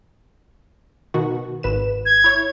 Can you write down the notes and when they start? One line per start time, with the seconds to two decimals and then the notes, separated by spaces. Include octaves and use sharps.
1.14 B2 D#3 F#4
1.63 G#1 B4 E7
2.06 G#6
2.24 E4 C#5